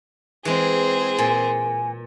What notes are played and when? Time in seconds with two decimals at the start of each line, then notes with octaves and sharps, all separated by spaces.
0.45 E3 G#3 C4 G#4
1.18 A#2 G#5